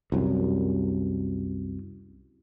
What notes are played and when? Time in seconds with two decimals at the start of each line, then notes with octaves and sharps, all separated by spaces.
0.12 C2 F#2